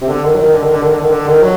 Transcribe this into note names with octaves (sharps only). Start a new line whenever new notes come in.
C3
D3
D#3
F#3
D#3
D3
D#3
D3
D#3
D3
D#3
D3
D#3
F#3